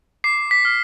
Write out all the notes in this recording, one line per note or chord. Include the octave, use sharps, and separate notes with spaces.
D6 C7
B6
F6